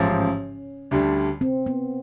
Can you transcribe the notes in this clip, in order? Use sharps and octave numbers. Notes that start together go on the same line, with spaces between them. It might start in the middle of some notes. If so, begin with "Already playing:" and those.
Already playing: A1 G#2 F3
C#4
D2 D3 G3
C4
B3